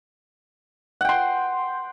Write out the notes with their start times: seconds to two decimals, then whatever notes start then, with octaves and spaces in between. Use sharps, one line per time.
1.01 F#5
1.05 G5
1.09 C6